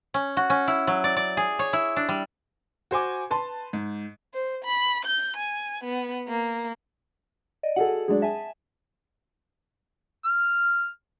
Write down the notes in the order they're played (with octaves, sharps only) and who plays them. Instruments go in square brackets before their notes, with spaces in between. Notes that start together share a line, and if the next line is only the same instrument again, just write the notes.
[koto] C#4
F#4
C#4
E4
F#3
D5
D5
G#4
C#5
E4
D4
G3
[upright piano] F#4 C5 G#5 D6
B4 A5 C6
G#2
[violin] C5
B5
G6
G#5
B3
A#3
[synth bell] D5 D#5
[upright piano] F#4 G#4 A4 [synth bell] F#5
[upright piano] F#3 G#3 D4 [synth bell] G#4
[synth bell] E5 G#5 [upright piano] A5
[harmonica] F6